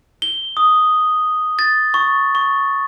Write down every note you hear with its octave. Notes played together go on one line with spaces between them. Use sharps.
G7
D#6
A6
C#6
C#6